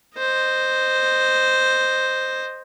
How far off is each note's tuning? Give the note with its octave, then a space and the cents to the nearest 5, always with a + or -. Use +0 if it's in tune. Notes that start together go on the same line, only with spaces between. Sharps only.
C5 +0 D#5 -10